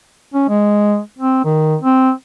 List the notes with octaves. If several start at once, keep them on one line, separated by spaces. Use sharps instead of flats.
C#4
G#3
C4
D#3
C4